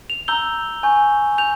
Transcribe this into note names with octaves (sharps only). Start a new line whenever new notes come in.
F7
A#5 E6 G6 G7
G#5 C#6 G6
G6 F7